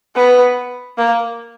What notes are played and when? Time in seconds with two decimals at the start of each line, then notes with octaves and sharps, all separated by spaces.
0.16 B3
0.98 A#3